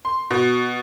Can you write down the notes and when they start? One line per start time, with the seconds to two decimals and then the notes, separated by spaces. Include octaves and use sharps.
0.05 C6
0.31 B2